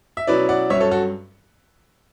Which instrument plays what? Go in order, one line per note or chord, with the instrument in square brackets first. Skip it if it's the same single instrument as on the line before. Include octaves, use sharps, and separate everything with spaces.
[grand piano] E5
B2 F#3 C#4 E4 B4 D5
D5 F#5
G2 F#3 C#4 C#5 E5
A4 C#5
F#4 A4